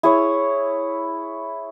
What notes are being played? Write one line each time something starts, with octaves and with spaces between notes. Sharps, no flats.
E4 G#4 C#5